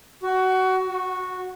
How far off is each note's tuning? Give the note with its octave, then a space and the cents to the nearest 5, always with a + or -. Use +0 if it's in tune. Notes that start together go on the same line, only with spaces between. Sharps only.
F#4 +20
F#4 -10